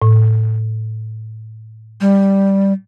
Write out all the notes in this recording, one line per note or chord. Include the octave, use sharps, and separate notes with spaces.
A2
G3